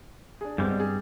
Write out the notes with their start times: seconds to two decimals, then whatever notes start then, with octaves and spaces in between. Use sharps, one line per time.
0.41 D4 G#4
0.58 G2 G3 G#3 B3 C4
0.80 G#4